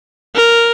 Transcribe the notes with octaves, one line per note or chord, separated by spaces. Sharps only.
A#4